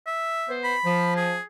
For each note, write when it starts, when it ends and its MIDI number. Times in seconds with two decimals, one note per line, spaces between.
0.07 0.55 76
0.48 0.75 59
0.48 0.75 72
0.64 1.16 83
0.84 1.36 53
1.16 1.42 68